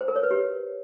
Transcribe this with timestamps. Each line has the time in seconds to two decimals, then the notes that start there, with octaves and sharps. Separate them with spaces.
0.01 C5
0.08 A#4
0.16 C#5
0.23 B4
0.31 G4